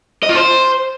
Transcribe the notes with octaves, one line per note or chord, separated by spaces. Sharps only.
D#5
F4
C5